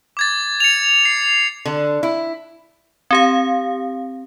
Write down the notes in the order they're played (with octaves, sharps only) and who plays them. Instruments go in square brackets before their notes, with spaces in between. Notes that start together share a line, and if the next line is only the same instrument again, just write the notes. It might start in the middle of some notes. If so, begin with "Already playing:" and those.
[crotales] D6 G#6 A6
C#7 F7
C7
[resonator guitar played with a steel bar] D3
E4
[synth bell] C4 G4 F5